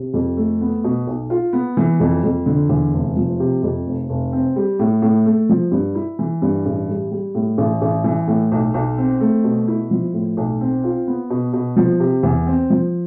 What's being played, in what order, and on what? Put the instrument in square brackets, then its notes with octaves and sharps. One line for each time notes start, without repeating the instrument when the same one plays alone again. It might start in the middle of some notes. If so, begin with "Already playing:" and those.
Already playing: [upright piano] C3
F2
A3
B3
B2
B1
F4
B3
E3
F2
F2
D3
E2
F1
F3
C3
F2
F1
F1
C4
G3
A2
A2
A3
F3
G2
E4
E3
G2
A1
G3
G3
A2
A1
A1
E3
A2
B1
B1
C4
A3
B2
E4
F3
A2
B1
C4
F4
B3
B2
B2
F3
C3
E2
C4
F3